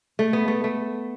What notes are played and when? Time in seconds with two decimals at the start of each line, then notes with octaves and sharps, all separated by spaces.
0.19 A3
0.33 B3
0.48 A3
0.64 A3